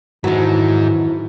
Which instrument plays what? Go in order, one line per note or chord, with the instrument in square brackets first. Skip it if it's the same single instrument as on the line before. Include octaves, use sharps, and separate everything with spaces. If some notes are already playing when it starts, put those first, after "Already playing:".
[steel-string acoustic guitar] F2 E3 [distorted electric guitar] G#2 G#3 [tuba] D#3 [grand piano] F#3